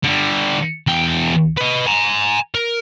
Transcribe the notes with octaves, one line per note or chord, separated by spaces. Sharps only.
D3 G3
E2 G5
B4 D#5
G#5 A#5
A#4